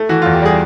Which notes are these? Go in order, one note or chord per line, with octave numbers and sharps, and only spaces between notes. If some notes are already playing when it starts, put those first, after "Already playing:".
Already playing: A3
E3 F#4
E2 F4
G4
G3 G#4